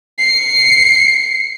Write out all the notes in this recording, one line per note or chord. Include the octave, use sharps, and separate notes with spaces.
C7 C#7